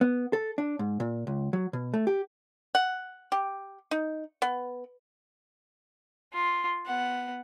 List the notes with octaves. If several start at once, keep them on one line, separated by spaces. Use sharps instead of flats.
B3
A4
D4
G#2
A#2
C#2
F#3
B2
A3
G4
F#5
G4
D#4
B3
F4
B3 F#5